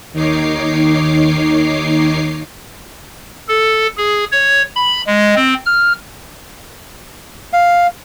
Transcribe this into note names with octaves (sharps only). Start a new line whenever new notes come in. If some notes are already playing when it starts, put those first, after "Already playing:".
D#2 D#3 D#4 C#5 D6 C7
A4
G#4
C#5
B5
G#3
C4
F6
F5